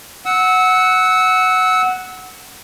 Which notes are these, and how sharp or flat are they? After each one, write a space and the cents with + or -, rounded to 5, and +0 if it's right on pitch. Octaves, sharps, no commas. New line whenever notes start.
F#5 +0 E6 -25